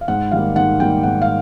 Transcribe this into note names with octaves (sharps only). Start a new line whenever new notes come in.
F5
G#2 F#5
D#3 G3 A#3 F5
G#2 F#5
D#3 G3 A#3 G5
G#2 F#5
F5